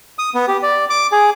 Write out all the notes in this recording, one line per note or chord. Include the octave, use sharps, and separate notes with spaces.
D#6
B3
G4
D5
D6
G#4